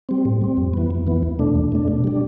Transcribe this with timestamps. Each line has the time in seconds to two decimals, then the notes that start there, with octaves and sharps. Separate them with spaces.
0.09 G3 C4
0.25 A2
0.41 G3 C4
0.57 F2
0.74 E3 B3
0.91 F2
1.07 E3 B3
1.23 E2
1.39 B2 A3 D4
1.55 E2
1.72 B2 A3 D4
1.88 B2
2.04 G3 D4